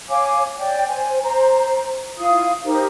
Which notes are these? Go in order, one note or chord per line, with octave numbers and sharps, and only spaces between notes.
C#5 F5 G#5 D6
C#5 D5 G5
C5 G#5
C5 A#5
E4 F4 F5 D#6
D#4 G4 A#4 C5